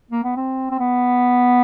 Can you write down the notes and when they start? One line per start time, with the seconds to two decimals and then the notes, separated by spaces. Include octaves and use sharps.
0.11 A#3
0.24 B3
0.36 C4
0.71 C4
0.79 B3